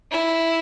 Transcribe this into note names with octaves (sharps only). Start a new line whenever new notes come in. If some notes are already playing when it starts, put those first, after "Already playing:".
E4